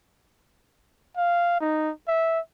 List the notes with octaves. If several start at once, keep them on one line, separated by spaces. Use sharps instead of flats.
F5
D#4
E5